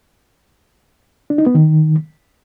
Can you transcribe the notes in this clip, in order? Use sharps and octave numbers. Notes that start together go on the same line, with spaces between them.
D4
D#4
B3
D#3